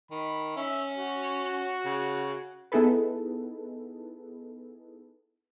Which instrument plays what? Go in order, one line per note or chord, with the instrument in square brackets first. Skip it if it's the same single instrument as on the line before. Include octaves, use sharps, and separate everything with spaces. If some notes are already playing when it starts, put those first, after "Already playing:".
[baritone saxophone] D#3 [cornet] B5
[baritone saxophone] C#4 [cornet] E5
[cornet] F#4
[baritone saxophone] C#3
[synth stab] B3 D#4 E4 G#4 A4 B4